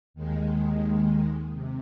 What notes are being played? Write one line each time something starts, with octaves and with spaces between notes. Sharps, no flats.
D#2 D#3 G#3
C3